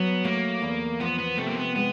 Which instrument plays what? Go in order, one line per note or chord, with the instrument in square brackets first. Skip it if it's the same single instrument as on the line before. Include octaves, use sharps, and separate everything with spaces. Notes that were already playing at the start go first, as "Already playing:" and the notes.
Already playing: [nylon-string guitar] F#3 [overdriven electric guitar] B3
[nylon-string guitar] A3 [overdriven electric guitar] A#3
[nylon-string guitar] E2
[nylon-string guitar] F3 [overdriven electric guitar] B3
[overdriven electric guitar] B3
[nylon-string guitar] C3 [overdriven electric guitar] A3
[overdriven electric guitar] A#3
B3
[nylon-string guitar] G#3 [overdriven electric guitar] B3